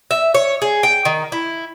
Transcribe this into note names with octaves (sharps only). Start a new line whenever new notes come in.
E5
C#5
G#4
G5
D#3
E4